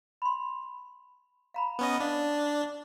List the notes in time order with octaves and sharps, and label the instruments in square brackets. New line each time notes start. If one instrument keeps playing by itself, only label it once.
[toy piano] B5 C6
F5 A#5 B5
[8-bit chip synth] B3 C#4 D#5
[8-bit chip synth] D4 [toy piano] F5